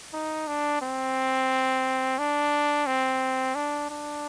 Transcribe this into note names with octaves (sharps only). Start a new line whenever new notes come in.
D#4
D4
C4
D4
C4
D4
D4